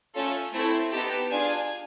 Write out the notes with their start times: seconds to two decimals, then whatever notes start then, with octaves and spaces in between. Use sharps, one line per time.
0.15 A3 C#4 F4 A4
0.53 A3 C4 E4 A4
0.92 B3 D#4 G4 A5
1.31 D4 F4 G#4 G#5